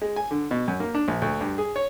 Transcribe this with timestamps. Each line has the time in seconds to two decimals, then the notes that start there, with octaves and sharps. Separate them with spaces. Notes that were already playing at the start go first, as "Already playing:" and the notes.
0.01 G#3
0.16 G#5
0.31 D3
0.51 B2
0.68 F#2
0.80 A#3
0.95 D4
1.08 A#1
1.22 D2
1.41 G2
1.58 G#4
1.76 C#5